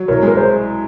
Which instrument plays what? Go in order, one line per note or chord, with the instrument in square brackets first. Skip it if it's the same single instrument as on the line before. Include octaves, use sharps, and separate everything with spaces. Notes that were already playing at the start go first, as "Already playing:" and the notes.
Already playing: [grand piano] F#3
[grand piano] C2 [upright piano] A#4 C#5
[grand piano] G#3
[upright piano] A#4
G#4 C5